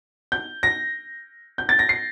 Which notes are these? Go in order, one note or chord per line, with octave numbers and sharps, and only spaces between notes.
G6
A#6
G6
A6
A#6
C7